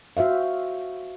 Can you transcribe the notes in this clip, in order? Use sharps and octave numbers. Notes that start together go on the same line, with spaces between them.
F#4 C5 E5 F5